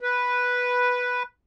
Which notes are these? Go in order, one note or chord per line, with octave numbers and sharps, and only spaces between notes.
B4